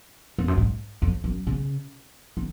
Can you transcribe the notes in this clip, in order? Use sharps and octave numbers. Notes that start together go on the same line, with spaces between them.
F2
F#2
G#2
F2
F#2
C#3
D#3